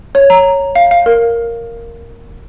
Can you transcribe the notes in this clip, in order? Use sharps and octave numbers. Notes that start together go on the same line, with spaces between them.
C#5
A#5
F5
F5
A#4